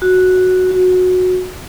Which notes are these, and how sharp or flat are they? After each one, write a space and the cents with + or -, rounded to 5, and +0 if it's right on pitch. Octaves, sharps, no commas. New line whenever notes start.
F#4 -5
F#4 -15